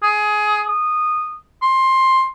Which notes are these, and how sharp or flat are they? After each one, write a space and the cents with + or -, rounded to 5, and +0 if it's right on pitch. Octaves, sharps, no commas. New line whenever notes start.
G#4 +20
D#6 -15
C6 +15